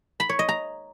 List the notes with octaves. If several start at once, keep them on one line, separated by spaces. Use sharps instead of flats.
B5
C#5
D#5
A#5